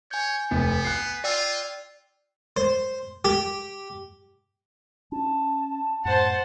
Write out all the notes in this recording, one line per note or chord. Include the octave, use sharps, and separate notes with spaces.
C#5 G#5 G6
F1 B3
F#6 C7
F4 D5 G5 E6
C5
G4
C#4 A5
F#2 A2 C5 F#5 A5